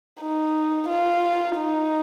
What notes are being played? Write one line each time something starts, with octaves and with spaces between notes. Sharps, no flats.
D#4
F4
D#4